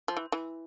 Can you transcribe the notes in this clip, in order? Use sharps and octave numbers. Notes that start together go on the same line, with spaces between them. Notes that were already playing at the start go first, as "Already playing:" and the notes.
F3
E3
E3